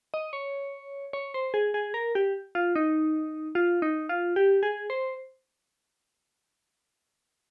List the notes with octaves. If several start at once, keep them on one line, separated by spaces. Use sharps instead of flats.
D#5
C#5
C#5
C5
G#4
G#4
A#4
G4
F4
D#4
F4
D#4
F4
G4
G#4
C5